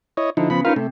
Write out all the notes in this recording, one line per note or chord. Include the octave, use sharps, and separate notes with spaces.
E4 C#5 D#5
D3 F3 D#4 E4
C#3 F3 B3 B5
C#4 D#4 F4 A#4 B4 F5
C3 A3